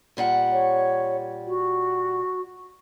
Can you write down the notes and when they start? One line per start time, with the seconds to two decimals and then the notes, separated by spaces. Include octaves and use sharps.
0.17 A#2 G3 F#5
0.52 C#5
1.47 F#4